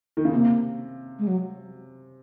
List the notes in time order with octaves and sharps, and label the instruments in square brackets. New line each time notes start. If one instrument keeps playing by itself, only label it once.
[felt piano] D#3
C#3
[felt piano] C3 [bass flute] A#3
[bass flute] G#3
F#3